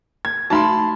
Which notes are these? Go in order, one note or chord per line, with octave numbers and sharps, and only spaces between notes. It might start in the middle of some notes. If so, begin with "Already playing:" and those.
G#6
A3 D#4 F#4 A5 B5 C6